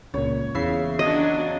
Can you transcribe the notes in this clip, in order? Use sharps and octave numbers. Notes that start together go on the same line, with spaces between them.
C#2 A#2 C#5
E2 C#3 E5 C7
F#3 D4 D#5